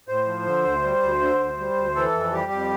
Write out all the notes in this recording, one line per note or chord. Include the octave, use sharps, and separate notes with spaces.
A2 C5
F3
D3
D2
G3
D2
D3
D2
G3
D2
E3 A4
F2
G3 G4
F2